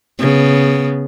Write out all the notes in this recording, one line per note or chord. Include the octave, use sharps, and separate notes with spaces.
C#3 B3